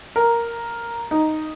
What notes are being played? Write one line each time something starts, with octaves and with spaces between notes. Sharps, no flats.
A#4
D#4